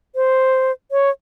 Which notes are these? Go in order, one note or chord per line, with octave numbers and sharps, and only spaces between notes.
C5
C#5